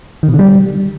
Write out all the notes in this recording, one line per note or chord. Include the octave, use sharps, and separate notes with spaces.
D#3
B2
D3
G3